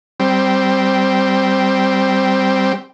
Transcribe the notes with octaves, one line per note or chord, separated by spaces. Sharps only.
G3 C4